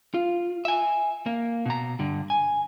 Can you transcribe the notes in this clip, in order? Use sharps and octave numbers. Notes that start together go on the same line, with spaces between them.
F4
E5 G#5
A#3
B2 A#5
G2 D3
G#5